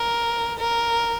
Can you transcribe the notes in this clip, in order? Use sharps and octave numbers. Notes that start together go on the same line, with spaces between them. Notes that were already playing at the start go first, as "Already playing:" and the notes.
Already playing: A#4
A#4